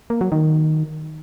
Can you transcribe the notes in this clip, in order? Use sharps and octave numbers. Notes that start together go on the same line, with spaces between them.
A#3
F#3
D#3